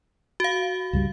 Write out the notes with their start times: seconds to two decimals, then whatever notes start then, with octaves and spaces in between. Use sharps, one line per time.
0.40 F#4 F5
0.93 C#2 G2 G3